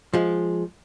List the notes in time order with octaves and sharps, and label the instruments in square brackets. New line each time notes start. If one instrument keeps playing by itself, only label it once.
[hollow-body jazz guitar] F3 G#3